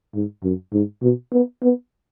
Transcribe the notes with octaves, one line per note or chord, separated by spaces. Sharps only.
G#2
F#2
G#2
B2
B3
B3